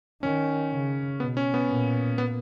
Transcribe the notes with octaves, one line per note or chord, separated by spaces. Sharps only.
D#3 C#4
C#3
B2 B3
C#4
B3
A#2
B3